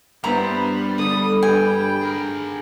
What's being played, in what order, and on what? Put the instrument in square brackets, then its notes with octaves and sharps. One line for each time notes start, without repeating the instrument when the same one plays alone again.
[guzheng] G2 E4 [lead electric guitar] G3 [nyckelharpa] B3 C5 [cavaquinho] A#5 B5
[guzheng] D3 D4 [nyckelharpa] D#6
[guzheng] G2 [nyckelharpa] G5 [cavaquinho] G#5
[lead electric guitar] G#4 A#4